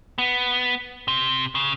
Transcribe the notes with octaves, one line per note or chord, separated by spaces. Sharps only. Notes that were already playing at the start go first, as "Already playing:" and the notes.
B3
C3
C#3